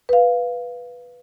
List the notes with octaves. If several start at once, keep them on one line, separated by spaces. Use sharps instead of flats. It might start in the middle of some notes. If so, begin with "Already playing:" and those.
B4 F5